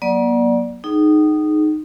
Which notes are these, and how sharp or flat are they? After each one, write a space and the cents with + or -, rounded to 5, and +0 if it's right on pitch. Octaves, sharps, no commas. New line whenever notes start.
F#3 +0 A#3 +40 D5 +0
D#4 -15 G#4 +20 G5 -40